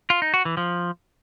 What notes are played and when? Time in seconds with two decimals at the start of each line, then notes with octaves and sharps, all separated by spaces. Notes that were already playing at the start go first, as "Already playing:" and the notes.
0.10 F4
0.22 D#4
0.34 F#4
0.45 E3
0.57 F3